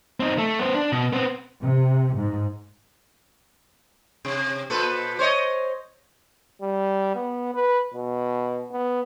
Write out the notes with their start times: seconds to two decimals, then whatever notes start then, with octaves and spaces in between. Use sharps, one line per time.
0.20 C4 D#4
0.38 A3
0.59 B3 C5
0.75 D4
0.92 B2
1.13 B3 C4
1.62 C3
2.15 G#2
4.25 C3
4.70 A#2 A4 B4
5.19 C5 C#5 D#5
6.61 G3
7.15 B3
7.54 B4
7.94 B2
8.72 B3